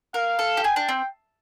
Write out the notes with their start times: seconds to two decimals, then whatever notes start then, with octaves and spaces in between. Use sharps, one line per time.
0.14 A#4 F5
0.39 A4
0.57 G4
0.64 G#4 G5
0.76 D4
0.89 C4